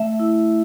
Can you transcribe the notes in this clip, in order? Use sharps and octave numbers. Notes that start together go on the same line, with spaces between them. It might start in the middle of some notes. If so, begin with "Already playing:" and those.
Already playing: A3 E5
E4